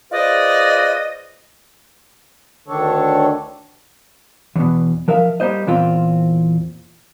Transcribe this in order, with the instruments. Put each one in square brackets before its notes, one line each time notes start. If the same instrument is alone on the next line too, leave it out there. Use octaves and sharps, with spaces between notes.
[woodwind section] F4 G#4 B4 C5 D5 D#5
[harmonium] D2 D3 D#3 D4 A4 C#5
[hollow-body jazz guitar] E2 B2
F3 A#4 E5 F5
G3 A#3 C5 D#5
E2 A#2 C4 F4